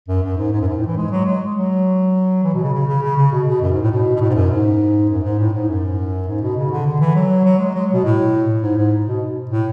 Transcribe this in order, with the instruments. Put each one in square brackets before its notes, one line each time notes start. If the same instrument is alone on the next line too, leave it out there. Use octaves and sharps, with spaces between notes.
[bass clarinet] F#2
F#2
G#2
G#2
F#2
G#2
A2
E3
G#3
F#3
G#3
F#3
E3
B2
C#3
C#3
C#3
C#3
C#3
B2
B2
F#2
G#2
A2
B2
B2
A2
G#2
F#2
G#2
F#2
G#2
A2
G#2
F#2
G#2
B2
C#3
D3
D3
E3
F#3
F#3
G#3
F#3
B2
A2
G#2
G#2
B2
A2